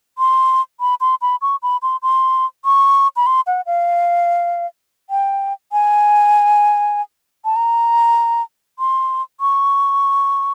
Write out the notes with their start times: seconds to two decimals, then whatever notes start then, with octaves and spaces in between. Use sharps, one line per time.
0.18 C6
0.80 B5
1.01 C6
1.22 B5
1.42 C#6
1.63 B5
1.82 C6
2.03 C6
2.65 C#6
3.16 B5
3.27 C6
3.47 F#5
3.66 F5
5.10 G5
5.72 G#5
7.45 A5
7.56 A#5
8.79 C6
9.40 C#6